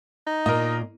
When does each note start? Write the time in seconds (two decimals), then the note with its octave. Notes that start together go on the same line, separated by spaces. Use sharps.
0.27 D#4
0.46 A#2 A#4 D#5